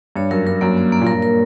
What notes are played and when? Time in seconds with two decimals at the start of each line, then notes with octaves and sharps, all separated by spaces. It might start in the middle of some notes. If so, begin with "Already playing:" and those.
0.16 G2 C#5
0.31 F#2 A#4
0.46 G2 A#4
0.61 F#2 A#3
0.77 A#3
0.92 A#3
1.01 A#2
1.07 G2 A#4
1.22 A#4